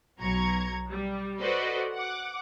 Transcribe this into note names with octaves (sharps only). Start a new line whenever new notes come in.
B1 F#3 A#5 C#6 G#6
G3
F#4 A4 B4 C5 D5 D#5
F#5 D6